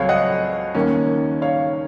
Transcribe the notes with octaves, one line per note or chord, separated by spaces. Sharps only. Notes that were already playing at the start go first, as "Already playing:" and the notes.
Already playing: C#2 F#3 A3 C4 C#5 F5
D#5 F#5
D#2 D#3 A#3 C#4
C#5 F5